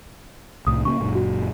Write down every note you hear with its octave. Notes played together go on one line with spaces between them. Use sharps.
C2 A2 D#6
C#3 A#3 C#6
F#1 F#2 A#2
F#4